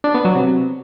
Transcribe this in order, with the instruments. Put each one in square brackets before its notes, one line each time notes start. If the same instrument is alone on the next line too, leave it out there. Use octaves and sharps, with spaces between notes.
[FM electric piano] D4
B3
F#3
C3